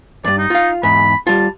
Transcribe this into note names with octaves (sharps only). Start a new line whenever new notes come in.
E2 G2 D5
D#4
F4 F5
E2 G#2 B5
G3 F4 A5